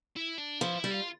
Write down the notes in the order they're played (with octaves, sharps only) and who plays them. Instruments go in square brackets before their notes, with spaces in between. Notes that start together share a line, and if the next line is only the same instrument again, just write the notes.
[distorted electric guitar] E4
D4
[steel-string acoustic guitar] F3 [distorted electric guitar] E4
[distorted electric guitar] E4
[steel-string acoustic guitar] G3
[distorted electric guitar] F4